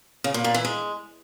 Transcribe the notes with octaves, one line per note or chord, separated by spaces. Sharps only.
C#3
A#2
A#2
E3
G#3